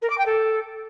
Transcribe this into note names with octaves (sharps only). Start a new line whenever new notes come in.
A#4
D6
G5
A4